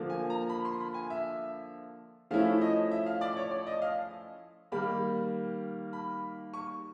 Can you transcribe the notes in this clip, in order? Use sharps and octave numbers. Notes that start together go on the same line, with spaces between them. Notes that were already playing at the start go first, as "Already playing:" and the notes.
Already playing: D3 F3 A#3
G#5
A#5
B5
C6
B5
G#5
E5
F3 A3 C#4 E4 F5
D#5
E5
F5
D5
C#5
D5
D#5
F5
D#3 G3 A#3 B5
B5
C#6